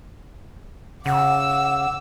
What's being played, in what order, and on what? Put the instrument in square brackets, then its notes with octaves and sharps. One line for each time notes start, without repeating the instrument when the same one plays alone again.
[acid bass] C#3 [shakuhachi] F#5 [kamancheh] D6 E6